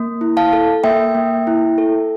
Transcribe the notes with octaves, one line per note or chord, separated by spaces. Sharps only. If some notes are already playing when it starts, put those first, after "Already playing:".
Already playing: A#3
E4
F5 A5
A4
A#3 E5 G5
A#3
E4
A4